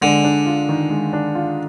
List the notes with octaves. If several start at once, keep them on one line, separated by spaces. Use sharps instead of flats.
D3 G#3
D4
F4
D#3
G#3
D4
F4